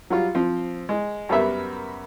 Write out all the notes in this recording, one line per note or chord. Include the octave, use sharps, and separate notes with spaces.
F#3 G3 F4
F3 C4
G#3
F#2 G3 B3 A#4 E5